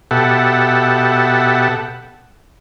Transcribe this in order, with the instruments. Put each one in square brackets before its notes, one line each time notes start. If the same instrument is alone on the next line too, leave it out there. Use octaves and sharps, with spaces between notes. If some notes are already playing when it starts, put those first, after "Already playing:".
[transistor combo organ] B2 G4 A4 E5 F#5